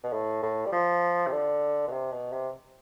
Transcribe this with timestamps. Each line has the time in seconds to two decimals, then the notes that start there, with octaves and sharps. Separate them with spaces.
0.04 B2
0.13 A2
0.42 A2
0.66 G3
0.72 F3
1.27 C3
1.32 D3
1.87 B2
1.92 C3
2.12 B2
2.32 C3